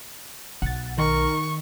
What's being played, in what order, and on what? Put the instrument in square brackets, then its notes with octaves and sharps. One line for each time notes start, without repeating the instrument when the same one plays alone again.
[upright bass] B1 [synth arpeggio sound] F#5 A6
[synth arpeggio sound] D#3 [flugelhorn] A#4 [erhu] C#6